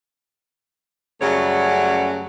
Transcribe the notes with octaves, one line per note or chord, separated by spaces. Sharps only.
F#2 C#3 G3 A3 C#5 F#5